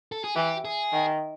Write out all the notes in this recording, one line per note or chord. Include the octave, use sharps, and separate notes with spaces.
A4
G#4
E3 G4
G#4
D#3